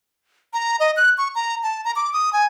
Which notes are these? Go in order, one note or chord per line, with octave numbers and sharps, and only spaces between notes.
A#5
D#5
F#6
C#6
A#5
A5
A#5
D6
D#6
G#5